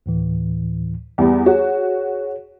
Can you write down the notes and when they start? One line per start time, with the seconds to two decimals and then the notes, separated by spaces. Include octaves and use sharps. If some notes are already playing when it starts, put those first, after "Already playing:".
0.06 D2 A2 E3
1.18 E2 G3 B3
1.46 F#4 G#4 C#5